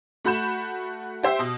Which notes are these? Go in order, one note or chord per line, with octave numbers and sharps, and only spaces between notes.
A3 F#4 B5 G6 E7
G4 C5 E5
B2